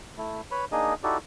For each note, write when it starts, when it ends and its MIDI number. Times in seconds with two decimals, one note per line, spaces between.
0.18 0.41 57
0.18 0.41 64
0.51 0.65 71
0.51 0.65 73
0.51 0.65 83
0.72 0.94 58
0.72 0.94 62
0.72 0.94 63
0.72 0.94 68
0.72 0.94 75
1.04 1.18 63
1.04 1.18 64
1.04 1.18 66
1.04 1.18 67
1.04 1.18 69
1.04 1.18 74